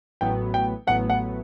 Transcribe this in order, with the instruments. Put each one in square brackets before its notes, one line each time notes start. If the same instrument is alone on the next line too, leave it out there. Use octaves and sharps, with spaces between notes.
[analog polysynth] A1 A2 F#3 B3 [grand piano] G5
[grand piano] G5
[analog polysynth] A1 A2 F#3 B3 [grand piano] F#5
[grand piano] F#5